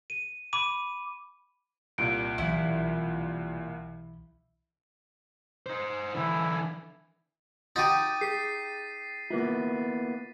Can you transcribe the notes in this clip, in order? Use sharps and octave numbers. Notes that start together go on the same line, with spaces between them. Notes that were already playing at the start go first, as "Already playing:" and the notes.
D#7
B5 D6 D#7
C2 A#2 D7
B1 E3 F#3 E4
D#4 C5
D3 E3 E4
D#4 G4 F#5 C6 A6 D#7
G#4 B6 C7
A#3 B3 E4 F4